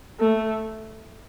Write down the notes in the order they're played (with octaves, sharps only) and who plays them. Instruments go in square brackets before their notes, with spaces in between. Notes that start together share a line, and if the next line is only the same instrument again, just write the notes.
[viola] A3